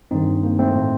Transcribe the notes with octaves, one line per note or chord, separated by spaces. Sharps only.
G2 D#3 C4 D#4
A#3
A3 C4
A2